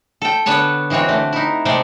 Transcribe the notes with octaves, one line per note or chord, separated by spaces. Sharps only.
A4 G5
D3 B3 B4 C#5 A5
E3 G#3 C4 F#4 C#5
D3 A3
D#4 E4
C3 G#3 A3 C5 D5 G5